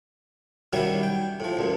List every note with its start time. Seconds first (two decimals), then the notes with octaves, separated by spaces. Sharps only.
0.73 D#3 F#3 G3 C#4 E4 F#4
1.03 G5
1.40 A2 F3
1.57 C#2 F#2 A#2